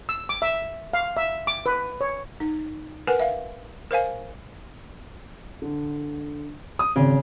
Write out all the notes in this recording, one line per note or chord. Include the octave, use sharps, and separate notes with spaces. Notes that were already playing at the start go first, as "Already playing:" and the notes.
E6
D6
E5
F5
E5
D6
B4
C#5
D#4
A#4 B4 F#5 G#5
E5 F5
A#4 C5 F5 G#5
D3
D#6
G#1 C#3